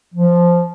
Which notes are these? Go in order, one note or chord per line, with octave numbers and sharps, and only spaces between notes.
F3